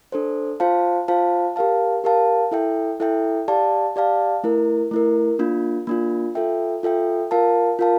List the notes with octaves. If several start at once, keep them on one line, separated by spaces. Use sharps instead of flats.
D4 A4 C5
F4 C5 F5 A5
F4 C5 F5 A5
G4 A#4 F5 A5
G4 A#4 F5 A5
E4 A4 E5 G5
E4 A4 E5 G5
G4 D5 F5 A5
G4 D5 F5 A5
A3 E4 A#4
A3 E4 A#4
A#3 D4 F4
A#3 D4 F4
F4 A4 E5 G5
F4 A4 E5 G5
F4 A#4 F5 A5
F4 A#4 F5 A5